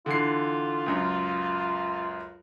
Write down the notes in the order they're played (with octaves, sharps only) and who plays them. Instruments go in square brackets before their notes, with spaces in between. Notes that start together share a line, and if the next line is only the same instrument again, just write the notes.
[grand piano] D3 E3 C7 [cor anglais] F4
[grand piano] C#2 F#2